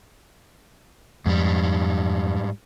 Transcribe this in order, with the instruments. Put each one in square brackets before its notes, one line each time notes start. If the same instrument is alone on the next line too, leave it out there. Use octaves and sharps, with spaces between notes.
[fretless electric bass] F2 [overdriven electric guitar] G#2 G3